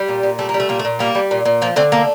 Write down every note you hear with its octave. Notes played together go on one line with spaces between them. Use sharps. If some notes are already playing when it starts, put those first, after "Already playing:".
Already playing: G3
A#2
A#2
G3 A3
A#3
G3
A3
A#2 A#3
A3
A#2
G3 A#3
G3
A#2
A#2
F3 A#3
D3 A3 C4
A3 A#3